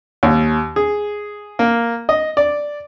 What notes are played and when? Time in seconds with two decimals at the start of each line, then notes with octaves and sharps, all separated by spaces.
0.23 D#2
0.76 G#4
1.59 A#3
2.09 D#5
2.37 D5